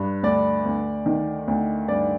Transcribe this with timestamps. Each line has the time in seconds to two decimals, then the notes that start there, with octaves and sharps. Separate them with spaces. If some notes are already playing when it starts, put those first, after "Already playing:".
Already playing: G2
0.23 D2 D5
0.65 D2
1.06 D#3
1.48 D2
1.88 G2 D5